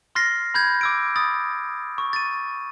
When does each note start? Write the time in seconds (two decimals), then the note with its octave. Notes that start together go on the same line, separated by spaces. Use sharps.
0.15 C6 F6 A6 A#6 C7
0.54 B5 G6 G#6
0.81 D6 E6 D7
1.16 B5 D#6 A6
1.98 C#6
2.13 A6 D#7